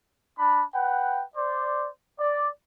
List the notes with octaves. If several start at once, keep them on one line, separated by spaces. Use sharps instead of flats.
D4 B5
B4 F#5 G5
C5 D5
D5